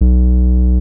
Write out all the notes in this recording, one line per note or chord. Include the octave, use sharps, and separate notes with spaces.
B1